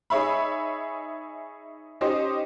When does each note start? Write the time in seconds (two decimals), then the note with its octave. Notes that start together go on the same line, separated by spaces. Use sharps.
0.10 D#4 G#4 C#5 E5 B5
2.01 C#4 D#4 G4 C5 D#5